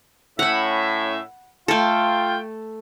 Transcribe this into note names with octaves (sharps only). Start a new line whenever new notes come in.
A2 C#4 E5 F#5 B5
A3 F4 A4 G5